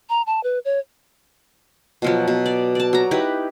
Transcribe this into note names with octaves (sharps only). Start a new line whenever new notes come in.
A#5
A5
B4
C#5
B2 F3 F#3
B2
D5
D5 A5
F#3 A#5
D#4 E4 G4 B4